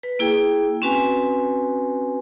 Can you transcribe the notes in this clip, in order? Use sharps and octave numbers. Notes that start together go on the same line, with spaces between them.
B4
A#3 E4 G#4 G5
C4 C#4 F#4 B4 G#5